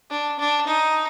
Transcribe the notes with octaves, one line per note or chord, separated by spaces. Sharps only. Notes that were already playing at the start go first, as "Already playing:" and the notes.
D4
D4
D#4